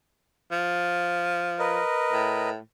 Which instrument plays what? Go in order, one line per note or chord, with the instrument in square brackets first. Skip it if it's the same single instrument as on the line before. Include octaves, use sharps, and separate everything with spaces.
[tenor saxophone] F3
[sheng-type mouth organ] A#4 B4 D#5
[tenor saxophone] A2